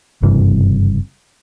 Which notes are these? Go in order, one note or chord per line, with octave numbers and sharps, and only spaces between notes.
F#1 G2 C3 E3